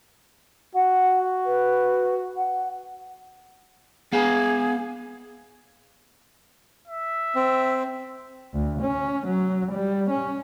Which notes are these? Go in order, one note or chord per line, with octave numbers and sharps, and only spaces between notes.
F#4 F#5
B4
F#5
B3 G#4 F5
E5
C4
D2
C#4
F#3
G3
C#4